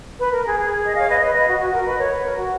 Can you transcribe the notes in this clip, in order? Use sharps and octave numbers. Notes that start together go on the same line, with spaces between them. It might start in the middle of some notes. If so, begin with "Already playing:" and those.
B4
A#4
G#4
G#4
D#5
C#5 F5
B4 D#5
B4 D#5
B4 D#5
F#4
F#4
A#4
B4 D#5
A#4 C#5
B4
A#4
F#4